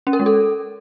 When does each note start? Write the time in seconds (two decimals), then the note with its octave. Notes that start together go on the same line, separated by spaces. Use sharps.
0.07 C#4
0.13 A#4
0.20 G#3
0.26 A4